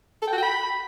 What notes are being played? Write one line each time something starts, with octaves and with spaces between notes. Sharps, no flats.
A4
G5
F#4
G5
B5